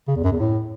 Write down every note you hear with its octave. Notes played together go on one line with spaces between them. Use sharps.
C#3
E2
F#2
E2
A2